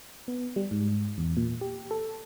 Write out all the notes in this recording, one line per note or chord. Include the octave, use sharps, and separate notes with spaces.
B3
G3
G#2
E2
A#2
G4
A4